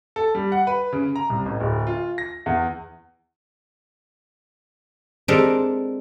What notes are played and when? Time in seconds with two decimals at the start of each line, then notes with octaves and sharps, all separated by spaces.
0.16 A4
0.35 G3
0.52 F#5
0.67 B4
0.93 C#3
1.16 A#5
1.30 C2
1.46 A1
1.61 D1
1.87 F4
2.18 A#6
2.46 E2
5.28 G#3 C4 D4 G4 A4 A#4